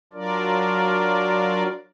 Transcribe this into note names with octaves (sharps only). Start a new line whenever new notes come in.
F#3 D4 F4 A#4 D5